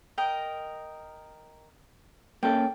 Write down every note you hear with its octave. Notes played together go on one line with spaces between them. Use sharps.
A#4 D#5 G5
A#3 C#4 A4 G5